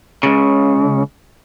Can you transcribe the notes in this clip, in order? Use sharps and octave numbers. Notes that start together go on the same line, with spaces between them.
C#2 C#3